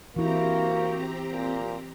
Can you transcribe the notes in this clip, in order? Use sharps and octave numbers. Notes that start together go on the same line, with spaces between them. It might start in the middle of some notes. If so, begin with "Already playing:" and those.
E3 A#3 C4 E4 F#4 G4 A#5
A#2